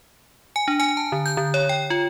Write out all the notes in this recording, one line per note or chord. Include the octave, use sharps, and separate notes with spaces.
G#5
D4
G#5
A5
D3
G6
D3
C#5
G5
F4